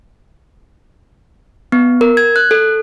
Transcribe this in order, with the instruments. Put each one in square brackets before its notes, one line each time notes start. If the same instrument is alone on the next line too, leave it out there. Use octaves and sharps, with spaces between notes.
[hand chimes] B3
A#4
G#6
F#6
A4